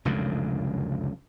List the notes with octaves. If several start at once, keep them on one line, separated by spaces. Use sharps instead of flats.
F1 C#2 F#2 D3